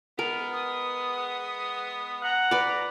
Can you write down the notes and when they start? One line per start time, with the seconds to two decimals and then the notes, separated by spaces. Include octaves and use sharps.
0.19 G#3 B3 A#4
0.53 D#6
2.23 F#5 A#5
2.51 B4 D5